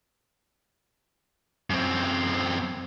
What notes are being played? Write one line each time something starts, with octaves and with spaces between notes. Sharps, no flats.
F#2 C4